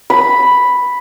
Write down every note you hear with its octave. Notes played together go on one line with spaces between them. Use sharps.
B5